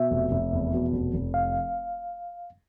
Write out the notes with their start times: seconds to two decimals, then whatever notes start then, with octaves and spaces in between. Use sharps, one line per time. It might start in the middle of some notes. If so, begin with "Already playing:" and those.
Already playing: B2 E5
0.11 F1
0.31 F1
0.52 E2
0.73 B2
0.93 F1
1.14 F1
1.34 F5